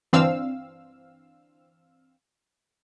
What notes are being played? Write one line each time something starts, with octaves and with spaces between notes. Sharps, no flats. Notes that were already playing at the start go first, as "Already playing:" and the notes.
G1 E3 C4 D4 F5 E6